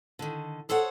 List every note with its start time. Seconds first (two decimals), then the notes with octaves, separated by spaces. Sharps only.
0.19 D3 D#3
0.69 G#4 A4 C5 C#5 F#5